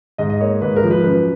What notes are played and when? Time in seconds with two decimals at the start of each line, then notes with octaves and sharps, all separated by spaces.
0.18 G#2 D#5
0.30 D#5
0.41 A#3 C#5
0.61 G#2 B4
0.76 A#4
0.84 F3
0.91 B4
1.04 F#2 B4